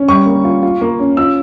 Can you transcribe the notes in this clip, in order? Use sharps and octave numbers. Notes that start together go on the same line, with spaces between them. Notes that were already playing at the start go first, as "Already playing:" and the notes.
Already playing: C#4
G3 C#6
A#3
F4
F4
A#3
C#4
F4 E6